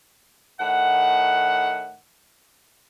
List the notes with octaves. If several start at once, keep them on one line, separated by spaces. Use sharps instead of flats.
A2 D#3 F#5